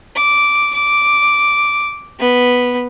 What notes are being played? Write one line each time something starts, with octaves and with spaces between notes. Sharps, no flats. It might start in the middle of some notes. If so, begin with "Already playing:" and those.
D6
D6
B3